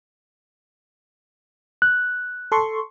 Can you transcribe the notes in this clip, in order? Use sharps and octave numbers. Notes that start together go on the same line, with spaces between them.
F#6
A4 C6 C#6